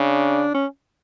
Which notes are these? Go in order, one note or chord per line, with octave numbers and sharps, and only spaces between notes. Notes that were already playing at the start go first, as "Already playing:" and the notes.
Already playing: C#3 D4
C#4